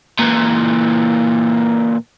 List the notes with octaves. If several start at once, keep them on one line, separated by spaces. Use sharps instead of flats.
A#2 E3